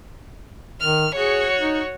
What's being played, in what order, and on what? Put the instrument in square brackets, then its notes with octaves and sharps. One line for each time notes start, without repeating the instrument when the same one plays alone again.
[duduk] D#3 [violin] F6
[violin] F#4 C#5 [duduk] G#4
[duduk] D#4